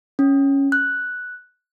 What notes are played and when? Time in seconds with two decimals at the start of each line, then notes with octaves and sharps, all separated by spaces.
0.19 C#4
0.72 F#6